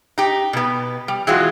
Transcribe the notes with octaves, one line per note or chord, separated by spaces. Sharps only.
D#4 G4
B2 B3
G3
E3 F#3 G#3 F4 F#4